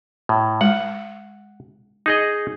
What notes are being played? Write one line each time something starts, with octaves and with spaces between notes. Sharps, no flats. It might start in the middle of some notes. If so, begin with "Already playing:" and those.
A2
G#3 F#5
D#4 G#4 D#5